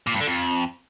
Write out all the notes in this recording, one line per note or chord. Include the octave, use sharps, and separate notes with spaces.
A#2
G2
D3
F2